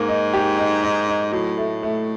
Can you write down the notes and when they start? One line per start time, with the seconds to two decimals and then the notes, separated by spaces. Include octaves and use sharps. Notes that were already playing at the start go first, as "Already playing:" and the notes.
Already playing: G#2 A#3
0.08 D#4
0.34 G4
0.58 D#4
0.83 D#4
1.08 D#4
1.33 A2 F#3
1.57 A3
1.83 A3